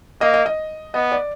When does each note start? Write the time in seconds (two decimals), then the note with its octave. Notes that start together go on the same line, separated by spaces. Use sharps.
0.21 A#3 D#5
0.34 D#5
0.46 D#5
0.94 B3 D#5
1.12 D5